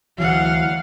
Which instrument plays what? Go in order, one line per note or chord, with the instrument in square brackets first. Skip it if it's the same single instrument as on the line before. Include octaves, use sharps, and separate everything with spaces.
[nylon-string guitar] D2 E3 F#3 [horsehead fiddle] F5 F#5